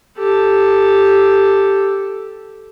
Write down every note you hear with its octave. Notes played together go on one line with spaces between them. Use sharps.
G4 A4